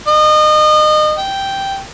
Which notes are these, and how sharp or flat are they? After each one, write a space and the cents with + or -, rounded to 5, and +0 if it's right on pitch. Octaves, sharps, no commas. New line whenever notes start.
D#5 -30
G5 -5